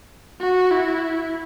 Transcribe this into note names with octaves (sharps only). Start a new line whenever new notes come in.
F#4
E4